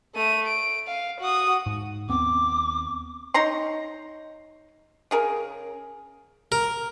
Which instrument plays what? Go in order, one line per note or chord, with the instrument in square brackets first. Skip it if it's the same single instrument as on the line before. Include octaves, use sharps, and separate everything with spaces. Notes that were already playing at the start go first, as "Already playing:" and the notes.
[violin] A3 D#7
D7
F5
F#4 D#6
[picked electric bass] G#2
[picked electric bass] D#2 B3 C4 [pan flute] D6
[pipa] D#4 C#5 A#5 C6
C#3 G#4 A#4
[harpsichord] A#4